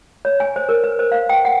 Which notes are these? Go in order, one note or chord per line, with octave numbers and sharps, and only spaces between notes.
C#5
G#5
C5
A#4
B4
C5
F5
G5
F#5